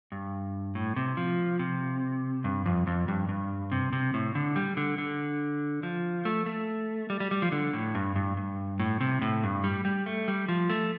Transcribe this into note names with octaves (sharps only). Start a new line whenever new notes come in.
G2
A2
C3
F3
C3
G2
F2
F2
G2
G2
C3
C3
A2
D3
G3
D3
D3
F3
A3
A3
G3
G3
G3
F3
D3
A2
G2
G2
G2
A2
C3
A2
G2
G3
G3
A3
G3
F3
A3